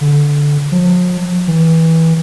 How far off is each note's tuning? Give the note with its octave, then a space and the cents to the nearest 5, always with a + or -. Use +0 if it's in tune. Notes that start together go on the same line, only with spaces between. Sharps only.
D3 -10
F3 +45
E3 -20